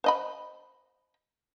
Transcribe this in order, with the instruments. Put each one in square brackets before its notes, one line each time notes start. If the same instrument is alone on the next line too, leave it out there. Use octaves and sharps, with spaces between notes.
[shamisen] C5 D#5 B5